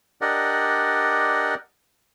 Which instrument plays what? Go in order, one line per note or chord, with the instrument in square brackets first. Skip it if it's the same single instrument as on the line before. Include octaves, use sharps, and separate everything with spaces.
[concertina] D4 G4 A#4 D5 D#5 F#5